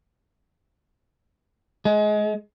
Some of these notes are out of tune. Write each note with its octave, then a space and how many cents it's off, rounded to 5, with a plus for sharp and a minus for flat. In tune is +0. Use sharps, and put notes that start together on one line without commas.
G#3 +25